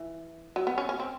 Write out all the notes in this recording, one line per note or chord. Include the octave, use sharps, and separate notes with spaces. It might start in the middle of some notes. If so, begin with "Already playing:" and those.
Already playing: E3
F#3
B3
C#4
C#4
C4